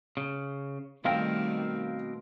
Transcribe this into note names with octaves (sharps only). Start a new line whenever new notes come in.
C#3
B2 D#3 G3 A3 C4 A#4 F5 G5